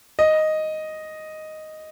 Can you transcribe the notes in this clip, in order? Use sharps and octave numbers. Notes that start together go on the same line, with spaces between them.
D#5